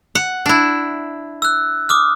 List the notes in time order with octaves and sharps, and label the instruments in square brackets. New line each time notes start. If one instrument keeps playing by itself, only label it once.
[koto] F#5
D4 E4
[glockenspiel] E6 F#6
D6 D#6 F6